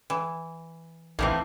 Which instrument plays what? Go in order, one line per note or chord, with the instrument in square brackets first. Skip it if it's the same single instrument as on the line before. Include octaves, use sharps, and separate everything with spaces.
[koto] E3
[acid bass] A#1 [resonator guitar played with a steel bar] A2 E3 C4 [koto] A#3 D#4 A#4